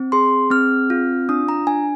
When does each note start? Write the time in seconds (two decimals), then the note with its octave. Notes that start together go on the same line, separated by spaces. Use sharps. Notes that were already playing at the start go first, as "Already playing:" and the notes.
Already playing: C4
0.12 G#4 C6
0.50 C4 F6
0.90 F4
1.29 D4 D#6
1.49 A#5
1.67 D4 G#5